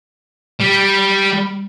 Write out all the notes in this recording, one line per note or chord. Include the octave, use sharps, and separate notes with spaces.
G3